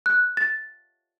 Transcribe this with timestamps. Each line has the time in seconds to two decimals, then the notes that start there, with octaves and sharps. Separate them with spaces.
0.06 F#6
0.37 A6